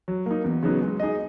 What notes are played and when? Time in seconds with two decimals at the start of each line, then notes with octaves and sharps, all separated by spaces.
0.08 F#3
0.26 A#3 D#4
0.44 E2
0.63 C#3 F#3 B3 D#4
0.81 G#3
1.00 D#4 G#4 D#5